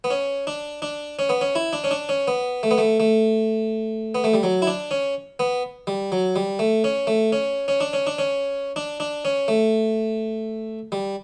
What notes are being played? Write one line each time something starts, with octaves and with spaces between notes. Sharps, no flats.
B3
C#4
D4
D4
C#4
B3
C#4
E4
D4
C#4
D4
C#4
B3
A3
B3
A3
A3
B3
A3
G3
F#3
E4
D4
C#4
B3
G3
F#3
G3
A3
C#4
A3
C#4
C#4
D4
C#4
D4
C#4
D4
D4
C#4
A3
G3